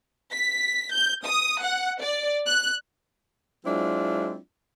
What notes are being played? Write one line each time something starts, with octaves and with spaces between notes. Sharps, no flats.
B6
G6
D#6
F#5
D5
F#6
F#3 G#3 C4 D4 E4 F4